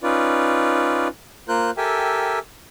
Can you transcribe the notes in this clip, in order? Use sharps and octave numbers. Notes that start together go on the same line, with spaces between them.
C#4 D#4 F4 B4 D5
A#3 F4 A#4 C5 F#6 G6
G4 A4 A#4 E5 G5 G#5